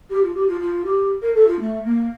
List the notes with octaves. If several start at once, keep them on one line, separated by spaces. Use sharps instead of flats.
G4
F4
G4
F4
F4
G4
A#4
A4
F4
A3
A#3